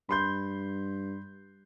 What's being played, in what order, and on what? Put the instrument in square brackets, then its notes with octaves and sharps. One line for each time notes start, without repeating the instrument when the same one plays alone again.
[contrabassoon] G2 [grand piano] B5 C6 G6